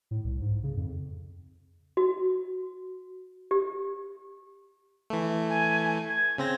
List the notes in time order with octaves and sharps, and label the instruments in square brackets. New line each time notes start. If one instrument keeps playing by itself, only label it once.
[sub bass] A2
C2
G#2
C#3
F2
[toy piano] F#4
G4
[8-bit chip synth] E3 A3
[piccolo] G#5
G#6
[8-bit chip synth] C#3 C4 A#6